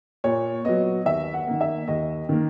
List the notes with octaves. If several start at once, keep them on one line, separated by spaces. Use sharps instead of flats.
A#2 C#5
F#3 B3 D#5
D#2 E5
F#5
D#3 A#3
E5
D#2 D#5
D#3 A#3